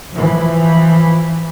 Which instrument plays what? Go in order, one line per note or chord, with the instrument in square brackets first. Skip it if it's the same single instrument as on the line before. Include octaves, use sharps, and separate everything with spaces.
[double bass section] E3 F3